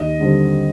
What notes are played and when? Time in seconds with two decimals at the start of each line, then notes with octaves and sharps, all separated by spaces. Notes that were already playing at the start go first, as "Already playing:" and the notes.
Already playing: D#2 D#5
0.20 D3 G3 C4